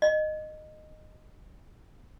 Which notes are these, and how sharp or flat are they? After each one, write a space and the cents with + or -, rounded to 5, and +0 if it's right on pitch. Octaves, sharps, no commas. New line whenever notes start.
D#5 -15